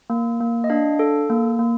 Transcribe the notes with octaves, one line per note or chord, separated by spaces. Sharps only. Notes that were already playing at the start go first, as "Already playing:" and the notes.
A#3
A#3
D#5
D4 F5
A4
A#3
A#3